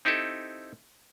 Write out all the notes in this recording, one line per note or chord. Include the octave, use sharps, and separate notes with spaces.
C4 D#4 E4 G4 A4